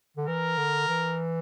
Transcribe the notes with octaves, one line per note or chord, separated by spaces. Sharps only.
D3
E3 A#4
D3
E3